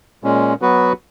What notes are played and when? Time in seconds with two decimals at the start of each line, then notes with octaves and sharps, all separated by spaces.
0.24 A#2 G#3 C#4
0.61 F#3 B3 F#4 B4